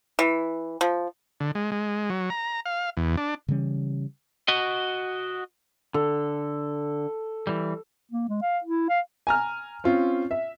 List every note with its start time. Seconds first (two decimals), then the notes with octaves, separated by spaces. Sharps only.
0.19 E3
0.81 F3
1.40 D3
1.55 G#3
1.72 G#3
2.10 F#3
2.30 A#5
2.66 F5
2.97 E2
3.17 D4
3.48 C#3 E3 G3 C#4
4.48 F#4 D#5
5.94 D3 A4
7.47 E3 G3
8.12 A#3
8.29 G#3
8.42 F5
8.64 E4
8.89 F5
9.27 G#5 A#5 F6
9.84 C4 C#4 F4
10.31 E5